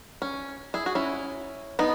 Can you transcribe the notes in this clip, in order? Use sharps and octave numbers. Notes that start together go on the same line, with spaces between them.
C#4
E4 G#4
F#4
C#4 E4
B3 D#4